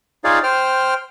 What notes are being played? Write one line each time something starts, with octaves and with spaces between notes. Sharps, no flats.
D#4 F4 G#4 C#5 D5 F5
C5 G5 F6